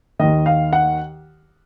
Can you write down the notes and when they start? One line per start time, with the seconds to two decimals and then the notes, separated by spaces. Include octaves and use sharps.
0.19 D#2 D#3 D#5
0.46 F5
0.73 F#5